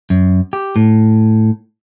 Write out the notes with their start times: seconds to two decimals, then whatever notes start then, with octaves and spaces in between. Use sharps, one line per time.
0.10 F#2
0.53 G4
0.76 A2